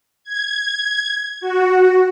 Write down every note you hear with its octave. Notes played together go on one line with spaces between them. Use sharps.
G#6
F#4